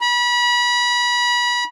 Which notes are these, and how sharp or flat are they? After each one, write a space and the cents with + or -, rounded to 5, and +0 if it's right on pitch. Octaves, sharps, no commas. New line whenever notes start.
B5 -30